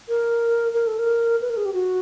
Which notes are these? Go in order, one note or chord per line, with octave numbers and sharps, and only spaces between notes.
A#4
A#4
A4
A#4
B4
A#4
G#4
G4
F#4